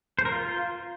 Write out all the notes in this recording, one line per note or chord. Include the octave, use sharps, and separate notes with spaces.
C5
A#4
F4